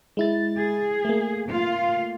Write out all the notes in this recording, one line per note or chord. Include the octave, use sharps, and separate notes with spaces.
G#3 E4 A6
G#4
A3 A#3
F4 F5